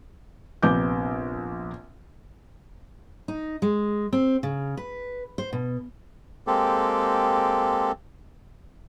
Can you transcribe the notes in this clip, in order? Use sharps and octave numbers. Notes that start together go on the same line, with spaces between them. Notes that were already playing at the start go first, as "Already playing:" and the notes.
A#1 C3 B3 D6 G6
D#4
G#3
C4
C#3
B4
C5
B2
G#3 A#3 C4 G4 A4